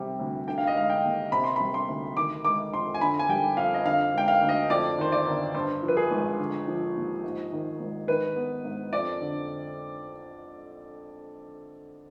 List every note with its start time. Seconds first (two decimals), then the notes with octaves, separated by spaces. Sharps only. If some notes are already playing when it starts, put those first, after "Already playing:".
Already playing: C3 G3
0.19 D2
0.47 D3 G5
0.58 F5
0.67 D#5
0.75 G#3 F5
0.90 G5
1.04 D#2
1.32 C3 B5
1.44 C6
1.56 G3 B5
1.74 C6
1.88 D2
2.16 D#3 D6
2.45 G#3 D6
2.73 F2 C6
2.94 G#5
3.01 D3 B5
3.19 G#5
3.29 G3 G5
3.57 F2 F5
3.74 D#5
3.85 D3 F5
4.14 G#3 G5
4.28 F5
4.42 D2
4.49 D#5
4.70 F2 D5
4.98 D#3 C5
5.12 D5
5.27 G1
5.55 G2 C5
5.83 F3
5.88 B4
5.97 G#4
6.11 G#1
6.39 D3
6.67 F3
6.96 D#2
7.24 G#2
7.52 D#3
7.80 G#1
8.08 D#3 B4
8.36 B3
8.65 G#2
8.93 F2 D5
9.21 D3